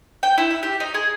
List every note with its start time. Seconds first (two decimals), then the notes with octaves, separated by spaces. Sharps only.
0.23 G5
0.38 E4
0.51 E5
0.63 G4
0.80 D#4
0.94 G#4